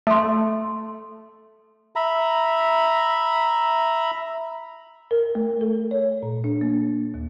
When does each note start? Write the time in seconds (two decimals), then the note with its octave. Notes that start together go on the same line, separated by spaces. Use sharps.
0.07 A3 A4 C6
1.96 E5 A#5 B5
5.11 A#4
5.35 A3
5.61 A4
5.91 C#5
6.23 A#2
6.44 D4
6.61 A#3
7.14 D#2